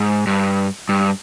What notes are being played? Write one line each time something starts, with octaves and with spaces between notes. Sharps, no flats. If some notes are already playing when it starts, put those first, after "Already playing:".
Already playing: G#2
G2
G2